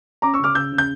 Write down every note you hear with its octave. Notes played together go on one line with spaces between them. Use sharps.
C#4 A#5 D6
C#6 E6
C#3 D6 F6
C#3 E6 G6
C#3
G6